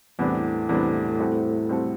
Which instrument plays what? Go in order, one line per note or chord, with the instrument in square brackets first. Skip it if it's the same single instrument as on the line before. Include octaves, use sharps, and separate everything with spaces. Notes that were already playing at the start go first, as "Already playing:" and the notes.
[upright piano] E2 C3 G3 B3 D4 [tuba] A2
[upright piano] E2 C3 G3 B3 D4
C3 G3 C4 F#4 A4
C3 G3 C4 F#4 A4